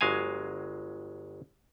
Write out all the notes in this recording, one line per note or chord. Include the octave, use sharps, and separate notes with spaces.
G1 F#3 G#3 F5 G#5